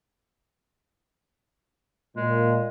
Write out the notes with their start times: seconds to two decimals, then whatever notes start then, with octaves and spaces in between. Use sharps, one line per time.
2.17 A#2 G#3